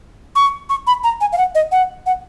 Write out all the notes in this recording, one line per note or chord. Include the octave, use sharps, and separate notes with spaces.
C#6
C#6
B5
A#5
G#5
F5
F#5
D#5
F#5
F#5